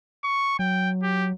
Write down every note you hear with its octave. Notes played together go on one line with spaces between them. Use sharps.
C#6
F#3 G5
G4